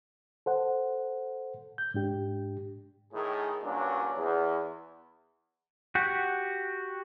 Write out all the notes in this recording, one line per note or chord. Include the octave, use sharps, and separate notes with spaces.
A4 C5 F#5
G6
G#2 D4 G4
A2 D#3 G#4
G2 A#2 F#3 C#4 D4
E2
F#4 G4 F#5